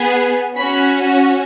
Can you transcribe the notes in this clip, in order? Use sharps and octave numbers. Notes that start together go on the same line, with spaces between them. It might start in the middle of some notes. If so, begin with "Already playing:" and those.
Already playing: B3 G#4
C#4 F#4 B5